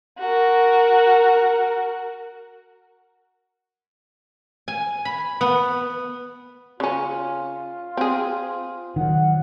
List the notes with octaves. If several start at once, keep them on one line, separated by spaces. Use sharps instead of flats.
F#4 A#4
G#5
B5
B3
C#3 C#4 F4
C4 G#4
D#3 F#3 F#5